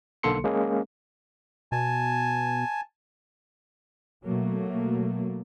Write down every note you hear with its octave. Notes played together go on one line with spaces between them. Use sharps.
B1 D3 A#3 A4 C6 C#7
G#3 A#3 C#4 G#4
B2 G#5 A5
B2 F#3 A3 A#3